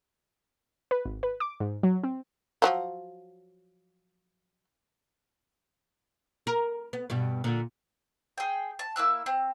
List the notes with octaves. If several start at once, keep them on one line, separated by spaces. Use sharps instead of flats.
B4
G#1
B4
D6
G#2
F#3
C4
F3 F#3 A#3
A#4
B3
G2 B2 G3
A#2 D3
G#4 G5
A5
A#3 E4 E6 F#6
C4